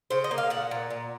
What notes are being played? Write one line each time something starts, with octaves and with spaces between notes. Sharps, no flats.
C#3 C5
D#5
A#3
F5
A#2 F#5
A#2
A#2